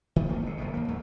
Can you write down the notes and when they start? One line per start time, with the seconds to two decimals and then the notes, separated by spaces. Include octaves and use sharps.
0.16 D#3
0.29 B1 A3 A#3
0.42 F#1 C3
0.58 F#1 F2 B2
0.74 D#2 A#3
0.88 A#1 G#2 F#3 A3